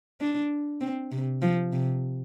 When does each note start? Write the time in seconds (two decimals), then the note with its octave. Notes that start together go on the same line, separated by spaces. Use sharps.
0.20 D4
0.81 C4
1.12 C3
1.42 F3
1.73 C3